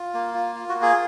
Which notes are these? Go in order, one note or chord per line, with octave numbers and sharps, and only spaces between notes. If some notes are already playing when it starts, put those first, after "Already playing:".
Already playing: F4
A#3
F4
F4
F#4
A#3
G#4